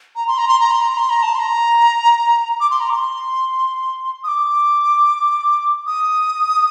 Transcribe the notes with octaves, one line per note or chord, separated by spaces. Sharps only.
A#5
C6
A#5
C6
A#5
C6
A#5
C6
A#5
A5
C6
A#5
D6
C6
A#5
D6
C6
D#6
D6
D#6